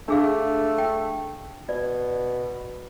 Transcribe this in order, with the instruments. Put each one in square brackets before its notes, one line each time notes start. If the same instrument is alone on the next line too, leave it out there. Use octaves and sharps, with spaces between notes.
[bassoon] A3 [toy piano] D4 G#4 F5
[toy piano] G5
[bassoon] B2 [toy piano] D5